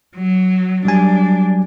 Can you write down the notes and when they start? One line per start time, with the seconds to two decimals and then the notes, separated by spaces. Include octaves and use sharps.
0.17 F#3
0.85 F#3 G3 D4 G#5